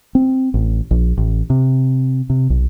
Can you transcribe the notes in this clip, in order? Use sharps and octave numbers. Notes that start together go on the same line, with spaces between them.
C4
A1
A#1
A1
C3
C3
B1